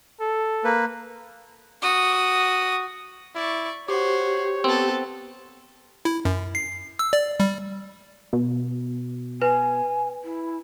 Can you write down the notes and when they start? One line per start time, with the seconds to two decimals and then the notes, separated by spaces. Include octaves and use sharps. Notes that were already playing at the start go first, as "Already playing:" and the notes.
0.20 A4
0.64 A#3 B4
1.82 F#4 D#6
3.36 E4 D5 C#6
3.88 F#4 G4 C5 C#5
4.64 B3 C4 A4
6.05 E4
6.25 F#2
6.55 C7
6.99 E6
7.13 D5
7.40 G3
8.33 B2
9.42 B4 G#5
10.24 E4